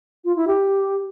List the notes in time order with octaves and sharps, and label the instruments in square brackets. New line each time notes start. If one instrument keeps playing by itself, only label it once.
[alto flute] F4
E4
G4